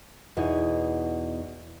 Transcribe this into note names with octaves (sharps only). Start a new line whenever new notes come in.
E2 B2 D#4 E4 C#5